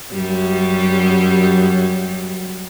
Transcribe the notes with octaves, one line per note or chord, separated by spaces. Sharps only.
F#2 G3